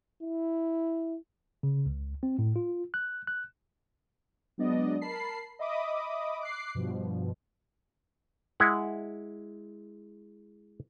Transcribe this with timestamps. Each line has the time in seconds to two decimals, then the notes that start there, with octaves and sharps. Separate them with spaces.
0.22 E4
1.63 C#3
1.86 C#2
2.23 C4
2.39 A2
2.56 F4
2.94 F#6
3.27 F#6
4.58 F#3 G#3 B3 D4 D5 D#5
5.02 A#4 A5 B5 C7
5.59 D#5 E5 B5 D6 D#6
6.41 D6 F#6 C7
6.75 G2 B2 F3
8.60 G#3 E4 F#5